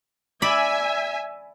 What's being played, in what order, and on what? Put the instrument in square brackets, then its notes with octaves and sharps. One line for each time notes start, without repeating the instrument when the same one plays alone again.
[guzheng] D5 B5 [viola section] E5 G#5